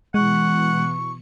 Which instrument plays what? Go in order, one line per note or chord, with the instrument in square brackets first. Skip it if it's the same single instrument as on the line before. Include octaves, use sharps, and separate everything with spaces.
[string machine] B2 E3 C#7 [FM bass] G#3 [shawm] F#5 [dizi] C#6